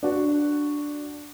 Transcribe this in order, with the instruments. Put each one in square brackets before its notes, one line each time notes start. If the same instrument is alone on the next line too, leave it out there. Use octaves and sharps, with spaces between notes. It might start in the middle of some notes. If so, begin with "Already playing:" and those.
[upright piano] D4 F#4